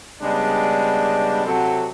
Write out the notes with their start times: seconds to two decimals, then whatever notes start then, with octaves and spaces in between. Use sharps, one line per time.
0.22 C#3 G3 G#3 B3 D4
1.45 C3 F#3 C4 F#4 A4